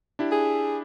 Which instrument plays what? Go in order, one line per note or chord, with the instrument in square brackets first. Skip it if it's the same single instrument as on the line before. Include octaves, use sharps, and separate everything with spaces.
[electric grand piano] D4 E4 G4
[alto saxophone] G#4